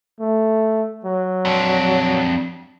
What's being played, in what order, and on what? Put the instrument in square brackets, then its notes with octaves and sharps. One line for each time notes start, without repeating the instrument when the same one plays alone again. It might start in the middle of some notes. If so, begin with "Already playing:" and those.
[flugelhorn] A3
F#3
[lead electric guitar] F2 D4